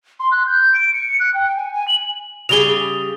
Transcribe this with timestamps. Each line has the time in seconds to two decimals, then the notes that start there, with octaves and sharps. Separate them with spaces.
0.20 C6
0.32 F#6
0.47 G6
0.74 D7
0.94 C#7
1.20 F#6
1.34 G5
1.57 G#5
1.73 G#5
1.88 F#7
2.49 C#3 G3 G#4 F7 G7